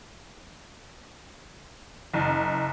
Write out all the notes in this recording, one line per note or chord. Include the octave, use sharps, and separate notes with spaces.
F#1